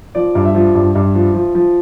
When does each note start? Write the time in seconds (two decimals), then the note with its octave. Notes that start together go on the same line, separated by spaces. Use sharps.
0.15 F3 D5
0.35 G2
0.45 E5
0.55 F3
0.75 G2
0.95 G2
1.15 F3
1.34 F3
1.55 F3